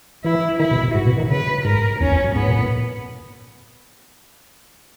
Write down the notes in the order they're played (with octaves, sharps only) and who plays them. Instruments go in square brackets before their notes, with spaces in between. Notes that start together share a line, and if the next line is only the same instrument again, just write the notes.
[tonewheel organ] E3 [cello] E4
[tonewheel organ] D#3 [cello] E4
[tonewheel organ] B2
B2
[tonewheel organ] G#2 [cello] F#4
[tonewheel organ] B2
D#3
[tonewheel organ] C#3 [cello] B4
[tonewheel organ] G#2 [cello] A#4
[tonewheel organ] E2 [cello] C#4
[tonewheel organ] E2
F#2
[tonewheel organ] G#2 [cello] B3
[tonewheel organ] A#2
A#2